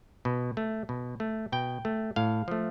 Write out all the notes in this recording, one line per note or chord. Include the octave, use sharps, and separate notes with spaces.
B2
A3
B2
A3
B2 G5
A3
A2 F5
F3 A3